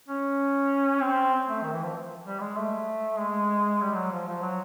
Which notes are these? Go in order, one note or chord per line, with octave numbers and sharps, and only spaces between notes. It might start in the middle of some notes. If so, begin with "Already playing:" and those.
C#4
C4
A3
D#3
E3
F3
G3
G#3
A3
G#3
G3
G3
F#3
F3
F3
F#3